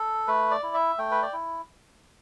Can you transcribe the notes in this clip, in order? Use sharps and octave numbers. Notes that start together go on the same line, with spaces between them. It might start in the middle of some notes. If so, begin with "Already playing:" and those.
Already playing: A4
A3 B4
D5
E4
E5
A3 G5
B4
D5
E4